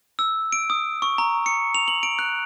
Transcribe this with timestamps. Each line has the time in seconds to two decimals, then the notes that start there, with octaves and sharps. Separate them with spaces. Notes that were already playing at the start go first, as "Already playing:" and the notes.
0.19 E6
0.52 D7
0.70 D#6
1.02 C#6
1.18 A#5
1.46 C#7
1.75 F7
1.88 F#7
2.03 D7
2.19 F#6